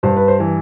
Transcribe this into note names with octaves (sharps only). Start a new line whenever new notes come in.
G2 C5
B4
C5
E3